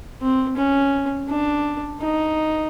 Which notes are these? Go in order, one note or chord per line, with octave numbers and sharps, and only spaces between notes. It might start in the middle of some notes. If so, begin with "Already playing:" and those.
C4
C#4
D4
D#4